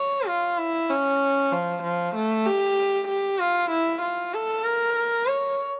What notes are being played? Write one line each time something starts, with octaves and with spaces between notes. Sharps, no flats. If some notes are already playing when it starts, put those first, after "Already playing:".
Already playing: C#5
F4
E4
C#4
F3
F3
A3
G4
G4
F4
E4
F4
A4
A#4
C#5